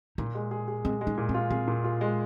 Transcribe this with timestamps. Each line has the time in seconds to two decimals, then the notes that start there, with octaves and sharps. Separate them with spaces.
0.18 A#2 D#4
0.35 G#3
0.51 G#4
0.68 G#4
0.84 G#3 C4
1.01 G#3
1.07 D#4
1.18 A#2
1.29 C4
1.34 F4
1.51 C4 G#4
1.68 A#2
1.84 F4
2.01 G#3